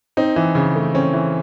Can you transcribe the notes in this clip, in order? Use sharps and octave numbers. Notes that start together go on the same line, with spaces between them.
C4 D#4
E3
C#3
A3
C4 C#4
E3